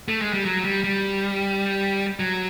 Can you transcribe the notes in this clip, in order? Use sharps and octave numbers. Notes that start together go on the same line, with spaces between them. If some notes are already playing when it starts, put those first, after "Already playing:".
A3
G#3
G3
F#3
G3
G3
F#3